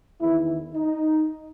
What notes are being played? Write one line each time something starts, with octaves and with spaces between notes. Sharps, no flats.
E2 D#3 E4
D#4